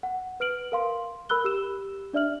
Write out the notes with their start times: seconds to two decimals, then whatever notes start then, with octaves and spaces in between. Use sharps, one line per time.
0.03 F#5
0.40 B4 F6 D7 F#7
0.72 A#4 F5 C6
1.29 A#4 B5 E6 F#6 G7
1.44 G4 E6 E7
2.13 D4 D5 E5 F6 F#7